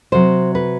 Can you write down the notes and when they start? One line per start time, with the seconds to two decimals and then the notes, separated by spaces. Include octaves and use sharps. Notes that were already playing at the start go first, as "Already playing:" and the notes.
0.12 C3 F#3 C5
0.55 B4